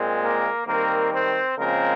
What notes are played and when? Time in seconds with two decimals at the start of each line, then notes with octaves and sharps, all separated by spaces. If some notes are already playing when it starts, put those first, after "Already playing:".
Already playing: A#2 G#3 C4
0.22 A#3 A#4
0.67 D#3 G3 A#3 C4 A#4
1.13 C4 C5
1.58 C#3 F3 G#3 A#3 C4 A#4